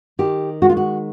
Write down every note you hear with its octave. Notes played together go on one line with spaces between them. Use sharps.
D#3 G4
G#3 F#4
F4
F#4